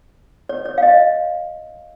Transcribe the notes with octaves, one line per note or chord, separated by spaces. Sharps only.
C#5
C#5
F5
D#5